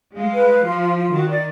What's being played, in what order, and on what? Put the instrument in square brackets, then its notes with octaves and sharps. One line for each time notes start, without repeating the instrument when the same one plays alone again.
[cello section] G#3 [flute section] F5
[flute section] B4
F5
[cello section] F3 [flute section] F4
[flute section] F4
F4
[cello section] D#3 [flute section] F#4
[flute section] D5